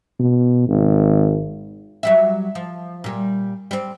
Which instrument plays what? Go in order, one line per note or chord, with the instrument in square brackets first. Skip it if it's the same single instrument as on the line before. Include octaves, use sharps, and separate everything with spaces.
[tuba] B2
G#1
[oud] F#3 G3 E5
F3
A#2 G3
G3 C4